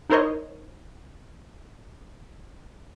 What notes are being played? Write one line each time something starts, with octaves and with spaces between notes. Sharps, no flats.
D#4 E4 A#4 C5 C#5 D#5